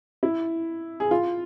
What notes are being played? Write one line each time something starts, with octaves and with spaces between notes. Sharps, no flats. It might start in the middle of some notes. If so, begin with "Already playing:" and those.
E4
G#4
F4